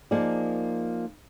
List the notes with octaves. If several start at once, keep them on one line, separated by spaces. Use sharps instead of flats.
F3 A#3 D#4 G#4 D5